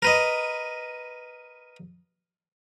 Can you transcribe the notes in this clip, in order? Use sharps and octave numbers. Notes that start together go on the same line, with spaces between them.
A#4 B4 D#5